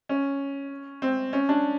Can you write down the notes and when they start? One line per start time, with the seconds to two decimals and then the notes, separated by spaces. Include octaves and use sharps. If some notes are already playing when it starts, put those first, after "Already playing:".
0.09 C#4
1.02 C4
1.33 C#4
1.49 D4